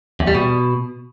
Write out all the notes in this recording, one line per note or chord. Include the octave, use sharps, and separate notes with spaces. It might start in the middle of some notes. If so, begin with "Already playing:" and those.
E2
G3
B2